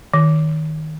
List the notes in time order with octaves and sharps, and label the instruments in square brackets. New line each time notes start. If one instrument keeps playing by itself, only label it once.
[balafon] D#3